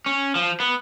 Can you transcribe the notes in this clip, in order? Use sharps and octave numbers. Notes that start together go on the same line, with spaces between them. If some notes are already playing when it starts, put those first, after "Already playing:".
C#4
F3
B3